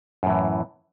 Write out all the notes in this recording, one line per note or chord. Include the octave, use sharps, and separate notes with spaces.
F#2 A2 E3